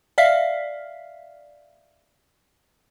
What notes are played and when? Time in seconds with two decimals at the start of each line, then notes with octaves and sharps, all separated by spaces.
0.18 D5 E5 F5 F6 B6 C7